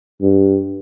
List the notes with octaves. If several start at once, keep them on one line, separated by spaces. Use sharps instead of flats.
G2